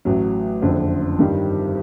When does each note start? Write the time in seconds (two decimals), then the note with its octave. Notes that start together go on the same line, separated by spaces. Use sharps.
0.05 A1 A2 F#3
0.62 F#1 F2 D3
1.19 G2 D#3 G3